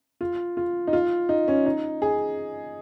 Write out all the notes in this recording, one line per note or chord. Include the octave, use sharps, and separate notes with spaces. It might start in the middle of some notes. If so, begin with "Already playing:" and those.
F4
F4
D#4
F4
D#4
C#4
D#4
G#4